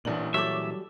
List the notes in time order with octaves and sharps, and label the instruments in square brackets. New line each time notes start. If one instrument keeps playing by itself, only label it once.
[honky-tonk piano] A1 D4 F#7 [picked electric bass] A#2 E3
[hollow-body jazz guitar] F#3 G3 A4 [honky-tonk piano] C#5 D6 [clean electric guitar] E5